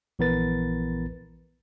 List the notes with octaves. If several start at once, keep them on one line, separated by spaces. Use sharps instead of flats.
A#1 E3 B3 A#4 B4 A6